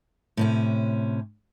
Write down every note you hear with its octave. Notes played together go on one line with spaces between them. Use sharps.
A2 C3 C#4